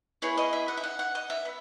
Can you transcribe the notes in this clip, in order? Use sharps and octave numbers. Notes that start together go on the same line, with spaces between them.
B3 E4 G#4 C#5
D#5
E5
F#5
E5
F#5
F#5
D#5
E5
B3